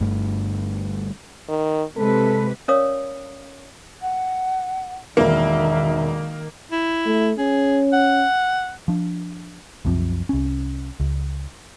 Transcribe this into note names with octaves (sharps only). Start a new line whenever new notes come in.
G1 G2 A3
D#3
C3 G#3 A4 B4
C#4 A#4 C#5 D5 F5 D#6
F#5
E1 B1 D#3 A#3 E5
E4
A3
C#4 G#4
F#5
F3 D4
C2 F#2 C3 F3
C2 C#4
C#2